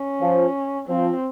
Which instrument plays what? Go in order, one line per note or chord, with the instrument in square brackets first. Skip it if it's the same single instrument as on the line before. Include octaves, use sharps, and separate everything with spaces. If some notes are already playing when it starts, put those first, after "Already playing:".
Already playing: [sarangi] C#4
[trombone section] F3
[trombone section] F3 [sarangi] C4